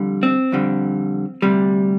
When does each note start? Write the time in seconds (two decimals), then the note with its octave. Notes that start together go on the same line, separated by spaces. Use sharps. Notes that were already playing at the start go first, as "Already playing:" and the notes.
Already playing: F2 D3 G3
0.23 C4
0.52 F2 D3 G3
1.42 D2 C3 G3